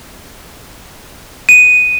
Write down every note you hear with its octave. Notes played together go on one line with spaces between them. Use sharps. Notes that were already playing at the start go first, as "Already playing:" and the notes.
D#7